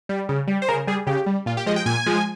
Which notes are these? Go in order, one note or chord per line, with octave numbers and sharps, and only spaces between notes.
G3
C#3
G3
C5
C#3 A#4
G3 G#4
C#3 G4
G3
A#2 F4
G4
F3 G#3 D#5
G5
A#2 G#5
F3 G#3